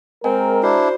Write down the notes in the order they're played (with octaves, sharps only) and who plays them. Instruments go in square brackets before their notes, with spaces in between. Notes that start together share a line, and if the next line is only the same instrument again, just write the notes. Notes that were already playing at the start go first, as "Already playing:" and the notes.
[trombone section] G#3 A#4 [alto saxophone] C4 [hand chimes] D#5 G5 G#5
[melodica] D4 E4 [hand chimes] F#4 D5 [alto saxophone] C5